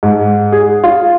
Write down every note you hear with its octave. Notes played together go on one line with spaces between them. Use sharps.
G#2
G#4
F4